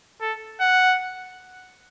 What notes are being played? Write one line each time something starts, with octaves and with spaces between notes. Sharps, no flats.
A4
F#5